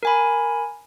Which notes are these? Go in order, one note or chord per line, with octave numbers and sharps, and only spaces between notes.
A#4 G#5 B5